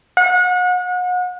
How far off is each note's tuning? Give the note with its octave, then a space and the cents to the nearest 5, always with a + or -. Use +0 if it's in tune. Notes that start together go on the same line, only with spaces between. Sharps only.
F#5 -35